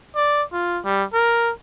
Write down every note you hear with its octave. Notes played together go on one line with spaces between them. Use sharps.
D5
F4
G3
A#4